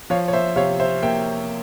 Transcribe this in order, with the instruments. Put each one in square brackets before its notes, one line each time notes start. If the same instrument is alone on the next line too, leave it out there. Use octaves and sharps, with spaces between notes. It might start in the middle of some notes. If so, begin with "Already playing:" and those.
[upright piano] F3 C#5 F5
C#5
C5 E5
C3 C#5 F5
C5 E5
A#3 E5 G5